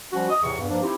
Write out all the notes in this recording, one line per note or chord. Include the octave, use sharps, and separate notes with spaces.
F3 G3 C#4 F#4
D#5
E2 A2 C3 E3 C#6
E2 G2
G2 F3 A#3 D4
C4 D#4 E4 G4